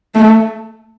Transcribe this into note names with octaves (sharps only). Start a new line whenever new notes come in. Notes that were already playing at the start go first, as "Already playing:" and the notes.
A3